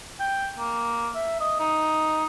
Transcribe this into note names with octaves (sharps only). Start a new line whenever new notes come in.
G5
A#3
E5
D#5
D#4